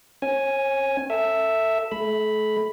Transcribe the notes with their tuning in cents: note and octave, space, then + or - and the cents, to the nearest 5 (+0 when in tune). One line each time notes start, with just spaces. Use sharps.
C#4 -35 G#5 +0
A4 +25 E5 +0
A3 -40 B5 +0